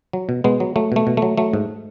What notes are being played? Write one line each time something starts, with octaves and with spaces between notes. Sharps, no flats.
F#3
B2
B2 G#3 B3
F#3
F#3 A3
B2 A3
B2
F#3 A3
F#3 A3
G#2